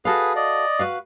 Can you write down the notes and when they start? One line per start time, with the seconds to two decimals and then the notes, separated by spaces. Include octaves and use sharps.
0.05 F#4 G#4 A4 B4 F5
0.36 D5 D#5
0.79 F#4 B4 F5